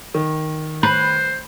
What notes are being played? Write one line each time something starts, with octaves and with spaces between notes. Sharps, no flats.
D#3
B4 C5